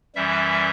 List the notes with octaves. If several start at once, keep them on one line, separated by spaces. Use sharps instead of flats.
F#2 E3 G3 E5